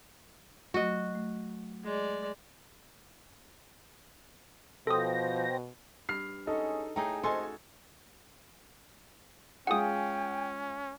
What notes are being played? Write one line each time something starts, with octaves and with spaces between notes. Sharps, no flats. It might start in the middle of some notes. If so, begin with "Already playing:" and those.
F#3 A3 F#4 D#5
A3
G#3 D5
B2 F3 A4 C5 G5 D#6 A#6
G2 F6 C7
G#3 C#4 D#4 G#4 A4
A2 A3 D#4 G#4 E5 G5 A#5
F2 G#2 C#4 F#4 A4 D#5 G#5 C6
G#3 C#4 F4 G#4 F#5 G5 D#6